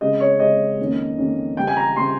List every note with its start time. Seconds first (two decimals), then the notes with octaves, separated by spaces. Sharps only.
0.01 C#3 G#3 C4 D#5
0.20 C#5
0.40 C#3 G#3 C4 D#5
0.79 F2 D#3 A#3 C#4
1.18 F2 D#3 A#3 C#4
1.57 C#3 G3 C4 G5
1.67 G#5
1.77 A#5
1.96 C#3 G3 C4 C6